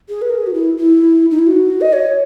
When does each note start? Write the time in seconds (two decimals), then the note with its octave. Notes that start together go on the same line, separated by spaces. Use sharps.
0.09 G#4
0.22 B4
0.30 A#4
0.38 G#4
0.47 F#4
0.54 E4
0.77 E4
1.30 D#4
1.39 E4
1.47 F#4
1.81 D#5
1.93 C#5